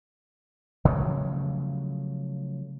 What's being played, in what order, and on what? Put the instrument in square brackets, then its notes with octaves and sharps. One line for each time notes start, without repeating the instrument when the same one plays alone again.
[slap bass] C#3 F3 F#3 A3